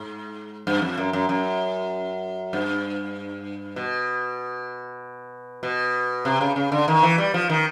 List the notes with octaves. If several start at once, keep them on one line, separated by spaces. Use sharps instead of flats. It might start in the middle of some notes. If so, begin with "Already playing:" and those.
Already playing: G#2
G2
F2
F#2
F#2
F#2
G2
B2
B2
C3
C#3
C#3
D3
D#3
E3
G3
F3
D#3